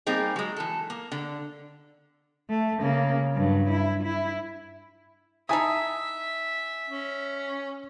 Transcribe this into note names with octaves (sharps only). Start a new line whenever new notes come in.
G3 A#3 C4 D#4 G#4
F#3 G#3
E3 A4
A#3
D3
A3
C#3 A#3
G2 F#3
E4
E4
D#4 E4 E5 G#5 A5 D#6
C#4